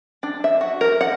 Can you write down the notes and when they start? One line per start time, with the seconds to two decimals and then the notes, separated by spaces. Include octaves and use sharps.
0.23 D4
0.44 E5
0.61 F#4
0.81 A#4
1.01 F#5